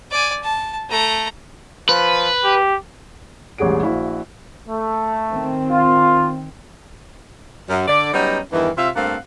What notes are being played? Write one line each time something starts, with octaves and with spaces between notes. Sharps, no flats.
D5 G#5
A5
A3 A#5
F3 B4
G4
E1 A1 G3 G#4 F#5 D7
A#1 E4 F#4 F5
A3
D#3 C4
F4
F#2
D3 D5
F#3 G3 B3 C#4 D#4
E2 G2 D#3 E3
C3 F4 E5
G2 A3 A#3 C4 F5 F#5